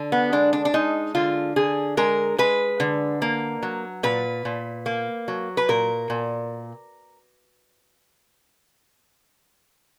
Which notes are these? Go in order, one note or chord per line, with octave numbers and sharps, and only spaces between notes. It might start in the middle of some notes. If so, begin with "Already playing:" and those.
Already playing: D3
B3
G#3 D4
D4
D4
G#3 D#4
D3 F4
D3 G#4
G#3 A#4
G#3 B4
D3
A#3
F#3
A#2 B4
A#2
A#3
F#3
B4
A#2 A#4
A#2